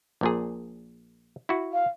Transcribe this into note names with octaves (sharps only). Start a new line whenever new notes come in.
A#1 A#2 G#4
E4 F#4
F5